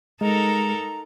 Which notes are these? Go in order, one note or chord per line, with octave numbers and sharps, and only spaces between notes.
G#3 D#4 A4 A#4 A#5